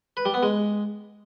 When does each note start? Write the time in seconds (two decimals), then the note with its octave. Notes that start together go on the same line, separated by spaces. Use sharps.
0.17 B4
0.25 G3
0.34 B3
0.43 G#3